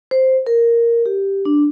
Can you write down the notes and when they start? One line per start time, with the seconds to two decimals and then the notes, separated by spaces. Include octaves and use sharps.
0.11 C5
0.47 A#4
1.06 G4
1.45 D4